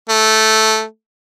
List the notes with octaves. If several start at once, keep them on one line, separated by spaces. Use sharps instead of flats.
A3